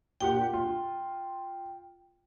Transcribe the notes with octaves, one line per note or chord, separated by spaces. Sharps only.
A#2 G4 F#5 G5
F4